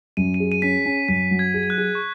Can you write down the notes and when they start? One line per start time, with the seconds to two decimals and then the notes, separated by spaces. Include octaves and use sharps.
0.17 F#2 D#7
0.34 D#7
0.40 G#4
0.52 D#7
0.62 C#4 B6
0.85 C#4
1.08 F#2 B6
1.31 F#3
1.39 G#6
1.54 G#4
1.63 G#6
1.70 F#6
1.78 G#4
1.95 C#6